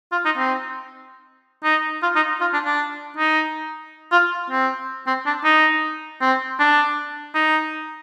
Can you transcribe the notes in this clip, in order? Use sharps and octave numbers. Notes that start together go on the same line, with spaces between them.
F4
D#4
C4
D#4
F4
D#4
F4
D4
D4
D#4
F4
C4
C4
D4
D#4
C4
D4
D#4